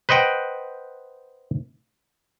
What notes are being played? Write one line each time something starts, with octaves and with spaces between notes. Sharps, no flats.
B4 C5 D#5 F#5 G5